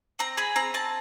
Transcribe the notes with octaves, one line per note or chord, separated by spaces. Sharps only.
C4 A#5
G#4 B5
C4 A#5
C4 A5